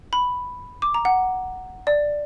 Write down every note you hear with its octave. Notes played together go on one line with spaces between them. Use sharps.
B5
D6
A#5
F#5
D5